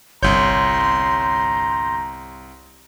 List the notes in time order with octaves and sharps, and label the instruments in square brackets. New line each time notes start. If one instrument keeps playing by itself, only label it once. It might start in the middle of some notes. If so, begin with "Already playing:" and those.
[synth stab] G1 G6 [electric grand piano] C2 C#5 [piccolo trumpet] A#5 [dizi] C6